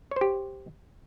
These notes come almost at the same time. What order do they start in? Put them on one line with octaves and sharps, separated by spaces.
C#5 C5 G4